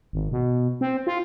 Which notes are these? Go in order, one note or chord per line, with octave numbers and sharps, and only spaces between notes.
G#1
B2
C4
F4